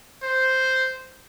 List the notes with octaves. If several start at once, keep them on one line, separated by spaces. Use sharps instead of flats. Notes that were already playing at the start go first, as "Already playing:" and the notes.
C5